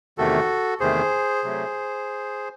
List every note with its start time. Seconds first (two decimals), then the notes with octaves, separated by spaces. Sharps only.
0.18 E2 C3 D#3 A3 F#4 A4
0.80 E2 C3 D#3 A3 G#4 C5
1.43 C3 F#3 A3